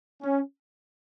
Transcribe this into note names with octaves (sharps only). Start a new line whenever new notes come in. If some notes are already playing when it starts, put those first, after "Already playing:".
C#4